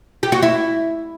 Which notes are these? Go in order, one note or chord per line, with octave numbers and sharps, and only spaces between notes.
G4
F#4
E4